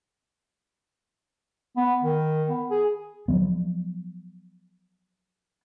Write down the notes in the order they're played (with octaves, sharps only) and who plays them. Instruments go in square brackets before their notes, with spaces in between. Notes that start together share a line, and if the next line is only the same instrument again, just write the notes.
[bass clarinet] B3
D#3
B3
G#4
[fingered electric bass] F3 F#3 B3